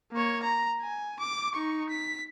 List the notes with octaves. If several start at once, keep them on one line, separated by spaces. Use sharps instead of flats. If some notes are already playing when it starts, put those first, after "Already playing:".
A#3 C#5
A#5
G#5
D6
D#4 C#6
B6